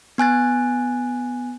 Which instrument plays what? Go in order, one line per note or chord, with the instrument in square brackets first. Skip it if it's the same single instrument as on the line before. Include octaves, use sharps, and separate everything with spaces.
[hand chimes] B3 G#5 F#6 A6